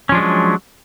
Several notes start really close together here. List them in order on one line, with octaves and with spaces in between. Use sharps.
C#4 F3 D4 G#3 F#3